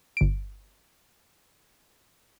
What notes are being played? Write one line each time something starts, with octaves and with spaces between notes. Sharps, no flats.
G1 D7